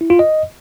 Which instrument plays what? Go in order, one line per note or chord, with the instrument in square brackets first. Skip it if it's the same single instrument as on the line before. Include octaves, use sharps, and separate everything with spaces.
[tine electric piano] E4
F4
D#5